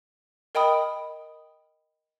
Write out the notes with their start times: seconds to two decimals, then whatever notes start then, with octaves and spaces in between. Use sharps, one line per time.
0.55 A#4 D#5 G5 B5 D#6